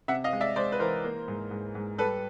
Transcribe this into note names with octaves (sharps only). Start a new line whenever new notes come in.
C3 E5 F#5
D#5 F5
G#3
D5 E5
G#3 C5 D5
B4
E3 A#4 C5
A#3
G#2
G#2
G#2
G3 A4 B4